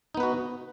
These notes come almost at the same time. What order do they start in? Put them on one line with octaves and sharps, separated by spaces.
D#4 B3 B4 F#4